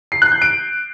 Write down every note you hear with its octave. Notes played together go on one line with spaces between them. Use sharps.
C7
F#6
G6
D7